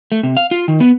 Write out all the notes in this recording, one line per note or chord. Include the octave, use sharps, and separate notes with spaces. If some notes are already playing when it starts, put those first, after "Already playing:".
A3
C3
F5
F4
D#3
B3